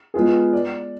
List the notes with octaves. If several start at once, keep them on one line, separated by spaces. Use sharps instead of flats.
G#3 B3 F4 G#4
D5